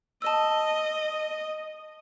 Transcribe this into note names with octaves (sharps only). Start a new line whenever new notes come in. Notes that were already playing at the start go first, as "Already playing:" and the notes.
D#5 A5 E6